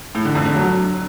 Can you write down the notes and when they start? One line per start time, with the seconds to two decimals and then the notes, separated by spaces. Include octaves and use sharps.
0.15 A2
0.25 D3
0.35 F2
0.45 D3
0.55 F#3